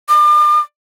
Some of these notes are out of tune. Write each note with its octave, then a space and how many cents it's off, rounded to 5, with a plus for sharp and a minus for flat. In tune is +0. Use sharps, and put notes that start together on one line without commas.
D6 +35